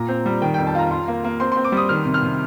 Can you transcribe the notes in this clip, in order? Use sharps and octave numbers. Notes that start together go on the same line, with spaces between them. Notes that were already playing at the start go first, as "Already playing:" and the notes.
Already playing: A#2 A#5
C4
G3
D#3 G5
G5
F2
A5
F4 A#5
F4 C6
A#3
A#3
C4 C6
C6
C4
D6
G3 D#6
D#3 F6
C3
F6
C3